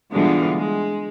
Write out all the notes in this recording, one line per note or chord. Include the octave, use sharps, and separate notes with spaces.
B2 D3 E3 G3 G#3 F4
G#3